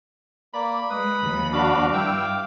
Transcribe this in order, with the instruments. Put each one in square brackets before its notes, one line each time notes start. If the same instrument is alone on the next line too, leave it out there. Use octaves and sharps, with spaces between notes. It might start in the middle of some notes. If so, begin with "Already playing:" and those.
[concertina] A#3 D5 [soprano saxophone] B5
[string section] G#3 [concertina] B4 D#6
[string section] D#2 F3
[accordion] D4 F#4 [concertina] F5 D6
[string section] G2 [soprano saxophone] E4 [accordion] G5 E6